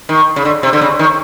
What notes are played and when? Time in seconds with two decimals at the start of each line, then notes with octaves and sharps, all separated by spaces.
0.09 D#3
0.36 C#3
0.45 D3
0.63 C3
0.73 D3
0.81 C#3
0.99 D#3